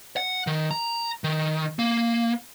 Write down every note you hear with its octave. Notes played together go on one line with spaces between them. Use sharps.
F#5
D#3
A#5
D#3
A#3